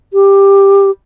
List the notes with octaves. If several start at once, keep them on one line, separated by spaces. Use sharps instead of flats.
G4